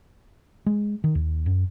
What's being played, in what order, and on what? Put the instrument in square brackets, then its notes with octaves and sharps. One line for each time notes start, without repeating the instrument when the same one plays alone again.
[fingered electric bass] G#3
D#3
D#2
F#2